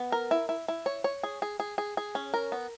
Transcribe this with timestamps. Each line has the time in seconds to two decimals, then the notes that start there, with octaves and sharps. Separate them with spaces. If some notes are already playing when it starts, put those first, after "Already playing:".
Already playing: B3
0.12 A#4
0.31 E4
0.49 E4
0.68 E4
0.86 C#5
1.04 C#5
1.23 G#4
1.42 G#4
1.60 G#4
1.78 G#4
1.97 G#4
2.15 C#4
2.34 A#4
2.52 B3